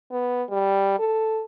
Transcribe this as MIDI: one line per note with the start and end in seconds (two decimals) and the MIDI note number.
0.12 0.43 59
0.49 0.98 55
0.99 1.43 69